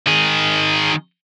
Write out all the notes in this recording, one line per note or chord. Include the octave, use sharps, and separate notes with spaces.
D#3 G#4